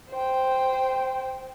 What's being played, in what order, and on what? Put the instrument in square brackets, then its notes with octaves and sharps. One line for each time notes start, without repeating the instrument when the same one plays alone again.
[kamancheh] C5 G5